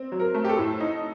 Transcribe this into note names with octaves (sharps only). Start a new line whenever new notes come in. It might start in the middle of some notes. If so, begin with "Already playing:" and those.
Already playing: C4
F#3
A#4
A3
G4
A4
A2
D#4